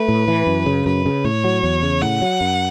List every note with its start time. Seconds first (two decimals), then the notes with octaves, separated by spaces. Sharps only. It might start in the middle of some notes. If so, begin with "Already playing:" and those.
Already playing: A3 B4
0.09 A2
0.28 E3
0.47 F#2
0.66 C#3
0.86 F#2 B4
1.06 C#3
1.24 A2 C#5
1.44 F#3
1.63 E2
1.83 C#3
2.02 A2 F#5
2.22 F#3
2.41 F#2